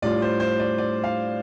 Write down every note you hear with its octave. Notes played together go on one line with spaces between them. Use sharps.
A2 G3 D4 F4 D5
C5
C5
D5
D5
F5